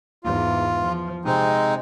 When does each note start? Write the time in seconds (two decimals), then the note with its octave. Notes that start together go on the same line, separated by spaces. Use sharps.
0.24 E2 G#2 F4
0.85 F3
1.25 C3 G#3 C4 D#4